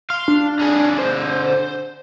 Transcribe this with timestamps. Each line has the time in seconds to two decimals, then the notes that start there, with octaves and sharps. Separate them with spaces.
0.10 F5 C6
0.28 D4
0.59 D3 G#4
0.99 C5